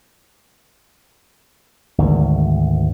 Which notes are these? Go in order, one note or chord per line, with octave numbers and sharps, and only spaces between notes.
G#1 D2